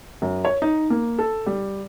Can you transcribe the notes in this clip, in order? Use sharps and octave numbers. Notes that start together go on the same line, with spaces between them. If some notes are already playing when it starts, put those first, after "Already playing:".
F#2
C#5
D#4
A#3
A4
G3